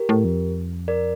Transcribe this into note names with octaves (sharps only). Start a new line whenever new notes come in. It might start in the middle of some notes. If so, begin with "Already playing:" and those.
Already playing: G4 A#4
A2
F2
A#4 D5